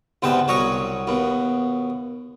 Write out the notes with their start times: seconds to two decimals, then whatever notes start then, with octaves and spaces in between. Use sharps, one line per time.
0.22 D2 G#2 C3 B3 G5 A5
0.48 C2 F#3 C#5 D#5 C#6
1.07 D#2 B2